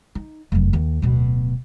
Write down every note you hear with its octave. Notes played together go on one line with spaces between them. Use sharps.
D#4
F1 F#2
D#2
D1 B2